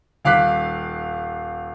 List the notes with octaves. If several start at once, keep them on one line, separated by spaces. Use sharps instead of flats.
D#1 F5 D6 F#6 B6